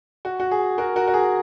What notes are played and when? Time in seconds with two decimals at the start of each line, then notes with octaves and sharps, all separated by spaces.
0.25 F#4
0.40 F#4
0.51 G#4
0.78 F#4 A#4
0.96 F#4 A#4
1.08 F#4
1.14 G#4